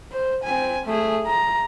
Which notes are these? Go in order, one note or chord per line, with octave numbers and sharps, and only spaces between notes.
C5
C4 G#5
A3 G#4
A#5